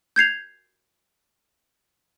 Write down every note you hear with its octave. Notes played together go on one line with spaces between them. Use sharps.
G6 G#6 C7 F7